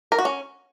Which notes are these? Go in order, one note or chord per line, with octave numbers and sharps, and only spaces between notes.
A#4
F#4
C#4